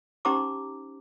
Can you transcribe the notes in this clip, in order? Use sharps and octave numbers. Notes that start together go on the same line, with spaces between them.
C#4 D#4 G4 C5 A#5 D6